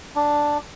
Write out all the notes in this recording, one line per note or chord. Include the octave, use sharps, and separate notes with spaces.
D4